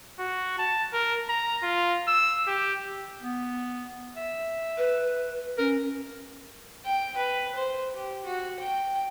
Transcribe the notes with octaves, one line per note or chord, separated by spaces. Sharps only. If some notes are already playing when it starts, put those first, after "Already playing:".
F#4
A5
A#4
A#5
F4
E6
G4
B3
E5
B4
C#4 A#4
G5
B4
C5
G4
F#4
G5